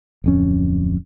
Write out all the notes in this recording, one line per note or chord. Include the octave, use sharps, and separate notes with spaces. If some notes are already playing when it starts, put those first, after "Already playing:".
D1 F2 C#4